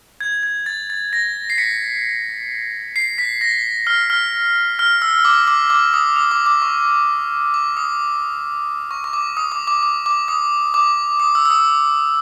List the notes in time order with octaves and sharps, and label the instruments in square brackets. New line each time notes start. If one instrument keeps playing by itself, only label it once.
[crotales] G#6
G#6
A6
A6
A#6
C7
B6 C#7
C7
B6
A#6
F6
F6
F6
E6
D6
D6
D6
D#6
D#6
D6
D6
C#6
D6
D#6
C#6
C#6
D6
D#6
D6
D6
D6
D6
D#6
D6
D#6
E6
E6
D#6